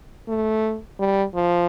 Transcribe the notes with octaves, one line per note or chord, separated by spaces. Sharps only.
A3
G3
F3